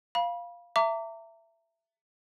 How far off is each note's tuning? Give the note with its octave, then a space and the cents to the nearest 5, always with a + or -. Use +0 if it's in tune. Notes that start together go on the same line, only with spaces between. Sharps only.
F5 +0 B5 -30
E5 +20 A#5 -35 D6 -30